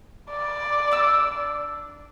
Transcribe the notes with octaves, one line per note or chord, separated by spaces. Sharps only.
D5
D4 E6